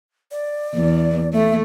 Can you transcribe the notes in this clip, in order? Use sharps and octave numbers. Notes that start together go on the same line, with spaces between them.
D5
E2
A3 E5